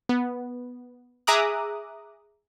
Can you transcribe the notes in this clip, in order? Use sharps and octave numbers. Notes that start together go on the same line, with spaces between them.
B3
G#4 E5 A#5 D6 D#6 F#6